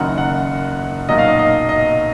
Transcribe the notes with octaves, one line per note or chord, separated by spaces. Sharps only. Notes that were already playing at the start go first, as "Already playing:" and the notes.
Already playing: F#1 F#2 D#3 F#5
F#5
B1 A#2 F#3 D#5
F5
D#5
D#5
D#5